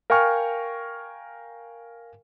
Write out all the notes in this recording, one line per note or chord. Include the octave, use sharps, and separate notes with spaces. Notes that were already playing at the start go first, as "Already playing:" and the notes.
A#4 F5 G5 G#5 C#6 F6